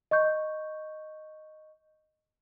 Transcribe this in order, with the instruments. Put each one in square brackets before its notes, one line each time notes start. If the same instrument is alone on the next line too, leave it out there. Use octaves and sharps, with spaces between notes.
[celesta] D#5 C#6 G6